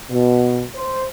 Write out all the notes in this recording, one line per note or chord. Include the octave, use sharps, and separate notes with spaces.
B2
C5